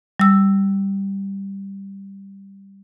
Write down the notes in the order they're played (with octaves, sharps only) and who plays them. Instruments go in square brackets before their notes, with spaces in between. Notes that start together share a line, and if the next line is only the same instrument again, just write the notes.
[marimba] G3 E6